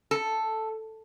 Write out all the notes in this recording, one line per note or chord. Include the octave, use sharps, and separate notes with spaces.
A4